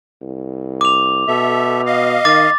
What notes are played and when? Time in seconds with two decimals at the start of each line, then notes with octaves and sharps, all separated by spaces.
0.22 C2
0.81 D6 F7
1.28 B2 A4 E5
1.86 D#5 F5
2.25 D#3 D6 A6